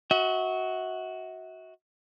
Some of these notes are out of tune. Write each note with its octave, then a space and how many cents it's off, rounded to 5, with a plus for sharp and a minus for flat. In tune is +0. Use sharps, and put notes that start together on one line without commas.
F#4 +0 E5 -40